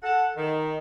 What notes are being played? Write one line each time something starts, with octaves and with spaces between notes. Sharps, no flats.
A4 F#5
D#3